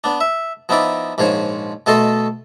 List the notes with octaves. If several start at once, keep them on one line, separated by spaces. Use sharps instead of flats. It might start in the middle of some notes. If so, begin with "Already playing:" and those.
B3 D4
E5
F3 B3 D#4 E4 D5
A#1 G#2 F3 C5 C#5
B2 A3 A4 D#5 A5 C6